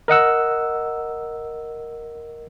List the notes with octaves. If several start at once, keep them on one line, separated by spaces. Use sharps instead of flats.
A#4 D#5 F#5 E6